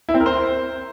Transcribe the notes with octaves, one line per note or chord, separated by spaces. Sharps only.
E4
C4
A#4
C5